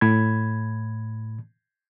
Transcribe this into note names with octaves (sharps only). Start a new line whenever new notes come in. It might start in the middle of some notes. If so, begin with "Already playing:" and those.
A2 B5 G#6